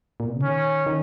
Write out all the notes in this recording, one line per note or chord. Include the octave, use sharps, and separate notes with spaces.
A#2
B2
C#3
D#3 C#4
D#3